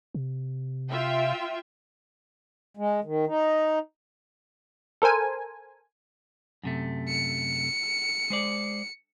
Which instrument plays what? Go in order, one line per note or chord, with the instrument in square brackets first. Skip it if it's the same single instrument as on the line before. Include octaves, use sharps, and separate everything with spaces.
[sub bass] C3
[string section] F4 E5 G5
[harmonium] G#3
D#3
D#4
[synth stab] A4 A#4 C5 G#5
[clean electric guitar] F#2 C3 A3
[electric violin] C#7
[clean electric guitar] G#3 C5 D5